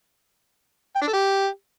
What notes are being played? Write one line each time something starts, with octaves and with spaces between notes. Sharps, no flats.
G5
D4
A4
G4